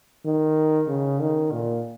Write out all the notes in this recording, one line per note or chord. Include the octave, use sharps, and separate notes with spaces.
D#3
C#3
D#3
A#2